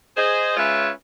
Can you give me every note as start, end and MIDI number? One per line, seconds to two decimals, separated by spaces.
0.17 0.54 68
0.17 0.54 72
0.17 0.54 75
0.57 0.90 56
0.57 0.90 61
0.57 0.90 65
0.57 0.90 71
0.57 0.90 73
0.57 0.90 76